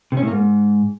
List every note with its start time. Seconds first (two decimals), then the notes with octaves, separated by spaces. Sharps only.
0.12 C3
0.17 C#4
0.22 A2
0.27 A#3
0.32 G#2